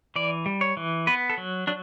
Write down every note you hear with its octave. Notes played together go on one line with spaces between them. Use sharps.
E3 D5
G3
C#5
E3
B3 B4
A4
F#3
F#3 D4